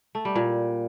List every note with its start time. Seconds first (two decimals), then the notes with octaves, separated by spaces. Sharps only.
0.15 A3
0.25 G3
0.35 A#2